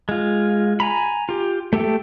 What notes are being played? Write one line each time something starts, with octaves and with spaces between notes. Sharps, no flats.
G#3 F4
G#5 A#5 B5
F4 G4
A3 G4 A4 G5